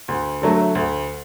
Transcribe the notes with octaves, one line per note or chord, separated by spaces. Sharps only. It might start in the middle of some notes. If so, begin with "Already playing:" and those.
D2
D3 F#3 A3
D2